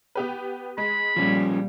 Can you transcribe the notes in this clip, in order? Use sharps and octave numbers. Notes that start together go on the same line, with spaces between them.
B3 G4 B4
G#3 B5
A#2 F3 G3 C#4